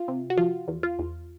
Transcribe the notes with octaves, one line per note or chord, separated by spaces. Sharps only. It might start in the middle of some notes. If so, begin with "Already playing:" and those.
Already playing: F4
C3
F#4
F3 F4
E2
F4
E2